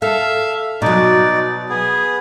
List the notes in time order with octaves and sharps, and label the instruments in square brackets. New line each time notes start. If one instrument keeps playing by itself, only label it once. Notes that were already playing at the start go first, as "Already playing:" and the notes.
[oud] A4 [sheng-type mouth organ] E5 F5
[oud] B2 F#3 [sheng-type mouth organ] D#4 D5
[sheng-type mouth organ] B3 G#4